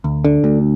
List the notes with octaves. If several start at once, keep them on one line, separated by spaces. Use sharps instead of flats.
D2
D3
D2